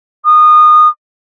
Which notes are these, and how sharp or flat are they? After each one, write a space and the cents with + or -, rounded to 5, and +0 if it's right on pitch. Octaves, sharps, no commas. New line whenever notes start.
D#6 -25